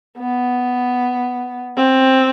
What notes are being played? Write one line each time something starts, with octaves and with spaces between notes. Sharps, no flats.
B3
C4